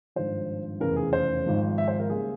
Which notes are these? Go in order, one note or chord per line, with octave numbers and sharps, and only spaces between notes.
G#1 G2 F3 C5
F1 E2 C#3 A#4
G#4
C5
G#1 G#2 F3
E5
C5
A#4
C#2 C#3 G3 A#3 G#4